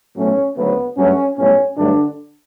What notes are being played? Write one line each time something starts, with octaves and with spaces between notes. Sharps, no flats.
B1 A2 F#3 A3 C#4
D2 C#3 F#3 A3 B3
G2 F#3 A3 C#4
B1 A2 G3 C#4
G2 D3 F#3 A3 D4